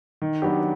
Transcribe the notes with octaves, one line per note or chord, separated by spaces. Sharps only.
D#3
F#3 B3 D4 G4